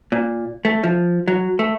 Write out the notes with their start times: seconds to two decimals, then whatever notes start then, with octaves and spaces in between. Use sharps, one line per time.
0.12 A#2
0.65 A3
0.84 F3
1.28 F#3
1.59 A3